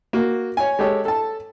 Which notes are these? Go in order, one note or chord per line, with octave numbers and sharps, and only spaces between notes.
A#3 F#4
C#5 G#5
G#3 G4 A4 C#5
A4 A5